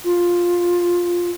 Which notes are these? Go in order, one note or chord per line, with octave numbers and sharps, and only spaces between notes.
F4